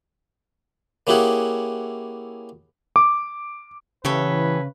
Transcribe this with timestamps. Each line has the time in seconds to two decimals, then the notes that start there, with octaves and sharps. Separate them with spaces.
1.07 A#3 C#4 E4 G4 G#4 F#5
2.96 D6
4.05 C#3 E3 G4 A4 B4 C#5